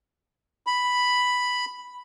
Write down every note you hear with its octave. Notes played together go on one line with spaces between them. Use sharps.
B5